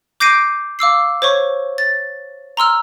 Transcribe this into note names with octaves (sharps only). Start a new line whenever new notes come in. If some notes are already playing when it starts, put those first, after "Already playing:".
D6 G6 A#6 C7 D7 D#7
F5 D6 E6 C7
C5 C#5 C#6
A6
A#5 C6 E6 F6